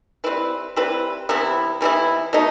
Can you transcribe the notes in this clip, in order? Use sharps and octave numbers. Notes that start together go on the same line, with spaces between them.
G3 C4 E4 B4
G3 C4 E4 B4
C3 E3 B3 E4
C3 E3 B3 E4
B2 A3 D#4